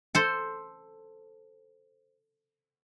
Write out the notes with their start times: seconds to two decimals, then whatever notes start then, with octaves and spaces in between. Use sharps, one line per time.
0.15 A4 C5